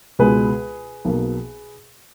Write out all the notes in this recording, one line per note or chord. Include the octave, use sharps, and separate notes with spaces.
C#2 B2 G#3 B3 G#4 B4
B1 B2 A#3